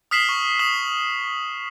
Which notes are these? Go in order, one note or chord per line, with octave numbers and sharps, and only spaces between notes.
D#6 F6 B6 C7 E7 F#7
C#6
D#6 E7 F#7